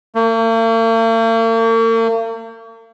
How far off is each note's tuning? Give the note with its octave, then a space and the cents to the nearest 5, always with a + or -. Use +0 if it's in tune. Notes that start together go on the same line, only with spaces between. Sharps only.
A#3 -45